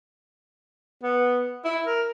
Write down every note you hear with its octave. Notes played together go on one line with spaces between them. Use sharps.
B3
E4
A#4